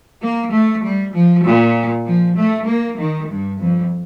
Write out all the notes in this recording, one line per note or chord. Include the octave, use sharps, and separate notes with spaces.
A#3
A3
G3
F3
A#2
F3
A3
A#3
D#3
G2
F2